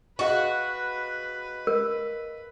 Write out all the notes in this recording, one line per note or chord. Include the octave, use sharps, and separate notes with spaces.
F#4 G#4 B4 D#5 F5
A#4